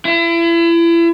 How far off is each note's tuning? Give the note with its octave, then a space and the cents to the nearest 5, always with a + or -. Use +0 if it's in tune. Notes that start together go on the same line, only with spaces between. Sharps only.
E4 +35